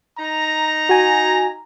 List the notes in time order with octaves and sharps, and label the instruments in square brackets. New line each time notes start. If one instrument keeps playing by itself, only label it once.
[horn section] D#4 A#5
[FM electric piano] F#4 G#5